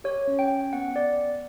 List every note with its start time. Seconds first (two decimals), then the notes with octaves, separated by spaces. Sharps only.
0.04 G4 C#5
0.27 C#4
0.39 G5
0.50 C#4
0.73 B3 F#5
0.96 B3 D5